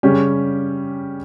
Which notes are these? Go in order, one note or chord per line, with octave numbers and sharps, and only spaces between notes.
C#3 G3 C#4 G4